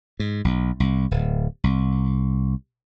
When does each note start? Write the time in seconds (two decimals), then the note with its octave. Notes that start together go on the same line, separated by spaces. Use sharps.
0.20 G#2
0.45 B1
0.80 C2
1.11 D1
1.64 C2